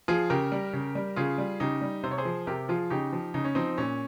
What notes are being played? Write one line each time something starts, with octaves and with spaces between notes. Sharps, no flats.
F3 F4 G#4
C#3 G4 A#4
G3
C#3
G3
C#3 F4 G#4
G3
C#3 D#4 G4
G3
C3 C5
C#5
G#4 C5
F3
C3 G4 A#4
F3 F4 G#4
C#3 D#4 G4
F3
C#3 D#4
C#4
F3 C4 D#4
A#2 C#4